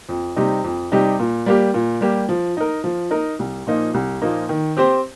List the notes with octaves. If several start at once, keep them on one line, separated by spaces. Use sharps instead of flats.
F2
C3 G3 D#4 G4
F2
C3 G3 D#4 G4
A#2
G3 A#3 G4
A#2
G3 A#3 G4
F3
D#4 A#4
F3
D#4 A#4
C2
A#2 F3 A#3 D#4
C2
A#2 F3 A#3 D#4
D#3
C4 G4 C5